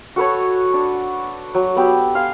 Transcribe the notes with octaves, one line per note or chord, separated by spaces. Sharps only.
F#4 A4 B4 C#5
D4
F#3
B3 G4 B5 E6
F5 G#5 C6